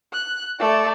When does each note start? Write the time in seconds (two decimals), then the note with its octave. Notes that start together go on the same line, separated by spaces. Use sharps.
0.13 F#6
0.59 A3 D5